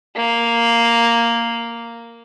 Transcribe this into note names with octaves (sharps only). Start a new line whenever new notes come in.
A#3